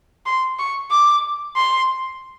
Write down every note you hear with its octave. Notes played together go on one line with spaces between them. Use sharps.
C6
C#6
D6
C6